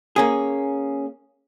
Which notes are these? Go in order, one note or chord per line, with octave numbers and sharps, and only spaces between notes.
A#3 C#4 G#4